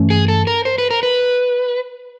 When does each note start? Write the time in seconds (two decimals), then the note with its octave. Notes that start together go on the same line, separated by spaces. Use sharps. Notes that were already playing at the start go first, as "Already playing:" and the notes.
Already playing: G2 E3 A3 C#4
0.10 G#4
0.28 A4
0.47 A#4
0.65 C5
0.78 B4
0.90 A#4
1.03 B4